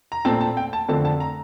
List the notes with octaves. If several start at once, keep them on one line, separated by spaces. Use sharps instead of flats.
A#5
A#2 A3 C4 A5
A5
G5
A5
F2 D3 A3 C4 A5
A5
A#5